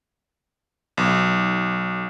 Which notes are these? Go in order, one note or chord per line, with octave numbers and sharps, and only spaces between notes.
B1